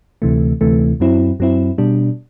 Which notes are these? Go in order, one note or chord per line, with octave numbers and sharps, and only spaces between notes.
D2 C3 E3 A3
D2 C3 E3 A3
F#2 F#3 C4 E4
F#2 F#3 C4 E4
B2 G3 D4